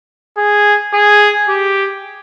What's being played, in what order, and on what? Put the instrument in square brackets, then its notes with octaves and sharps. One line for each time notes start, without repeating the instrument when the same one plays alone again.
[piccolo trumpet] G#4
G#4
G4